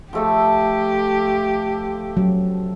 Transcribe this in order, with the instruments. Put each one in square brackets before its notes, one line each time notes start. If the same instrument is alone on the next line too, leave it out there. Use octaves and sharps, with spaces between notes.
[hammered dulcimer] F3 A3 A4 [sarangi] G4
[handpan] F#3